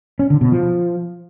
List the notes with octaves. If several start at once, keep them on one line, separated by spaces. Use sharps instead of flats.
C#4
D3
B2
F3